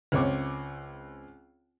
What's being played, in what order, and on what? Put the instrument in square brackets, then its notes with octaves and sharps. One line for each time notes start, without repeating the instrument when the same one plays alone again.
[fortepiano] C#2 C4 C#5 D6